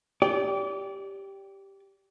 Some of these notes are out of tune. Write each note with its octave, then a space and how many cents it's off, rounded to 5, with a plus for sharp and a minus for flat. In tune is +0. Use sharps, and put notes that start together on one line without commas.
G4 +0 D5 -30